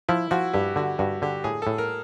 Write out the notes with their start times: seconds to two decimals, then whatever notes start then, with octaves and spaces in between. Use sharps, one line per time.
0.09 F3 E4
0.31 F3 F#4
0.53 G2 G4
0.76 D3 F#4
0.99 G2 F#4
1.22 D3 G4
1.44 A2 G#4
1.62 A2 A4
1.78 A#4